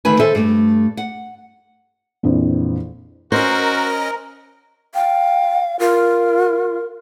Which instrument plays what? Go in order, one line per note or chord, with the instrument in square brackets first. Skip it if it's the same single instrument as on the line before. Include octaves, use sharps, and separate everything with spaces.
[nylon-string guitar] D2 D#3 E3 A3 B4 G#5
D#3 A4 C5 E5 G#5
G2 A3
F#5
[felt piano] A#1 F2 E3
[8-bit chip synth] C#4 D#5 A#6 [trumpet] F#4 [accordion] A#4 [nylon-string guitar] C5
[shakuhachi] F5 [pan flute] G5
[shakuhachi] F4 [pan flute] A#4